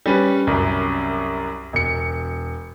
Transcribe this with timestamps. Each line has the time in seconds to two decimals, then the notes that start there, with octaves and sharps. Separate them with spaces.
0.06 G3 C#4 B4
0.47 C2 F#2
1.73 E1 C#7